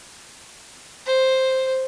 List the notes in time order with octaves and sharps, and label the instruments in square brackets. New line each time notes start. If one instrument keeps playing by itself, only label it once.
[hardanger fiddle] C5